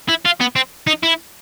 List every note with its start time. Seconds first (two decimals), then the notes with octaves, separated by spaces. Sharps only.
0.09 E4
0.26 F4
0.41 B3
0.56 C4
0.87 D#4
1.03 E4